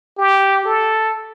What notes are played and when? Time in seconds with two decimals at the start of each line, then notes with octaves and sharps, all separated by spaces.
0.18 G4
0.65 A4